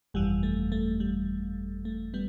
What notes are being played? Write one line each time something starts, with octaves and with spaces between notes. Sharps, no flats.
G1 F2 E3 G3
A3
A3
G3
A3
G3 B3